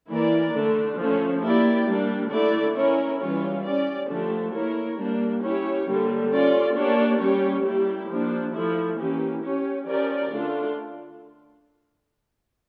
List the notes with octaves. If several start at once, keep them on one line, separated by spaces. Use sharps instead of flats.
E3 A#3 E4 A#4 D5
D3 A3 D4
F3 A3 C#4
A#3 E4 G4 D5
G3 A#3 D4
D3 A3 E4 A4 D5
C#4 E4 A#4 C#5
E3 G3 C#4 F4 C#5
C#4 G4 D5
D3 F3 A3 D4 G4
A#3 E4 A#4 C#5
G3 A#3 D4
C#4 E4 G4 C#5
D3 G3 A#3
C#4 F4 A4 D5
A#3 D4 G4 C#5
G3 C#4 G4 C#5
G3 A#3 E4 G4
F3 A#3 D4
F3 A3 E4
E3 A#3 C#4 G4
C#4 G4 C#5
F3 C#4 G4 A#4 D5
D3 A3 D4 F4